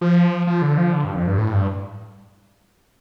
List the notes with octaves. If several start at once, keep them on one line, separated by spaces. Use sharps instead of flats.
F3
F3
D3
F3
D3
G2
F2
G2
A2
G2